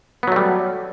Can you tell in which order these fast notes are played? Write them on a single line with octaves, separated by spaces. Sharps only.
B3 F#3 A3 G3